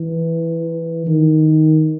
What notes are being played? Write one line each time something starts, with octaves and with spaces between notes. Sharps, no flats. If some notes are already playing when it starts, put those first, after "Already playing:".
Already playing: E3
D#3